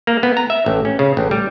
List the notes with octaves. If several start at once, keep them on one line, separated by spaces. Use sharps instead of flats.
A#3
B3
A#5
E5
A1
C#4
C#3
A1
G3